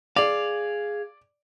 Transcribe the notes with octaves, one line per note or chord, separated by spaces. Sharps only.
G#4 D5 F5